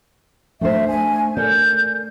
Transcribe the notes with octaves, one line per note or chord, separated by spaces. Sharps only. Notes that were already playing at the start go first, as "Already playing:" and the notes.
A3 D4 C5 E5
G#5
A4 A#4 D5 G6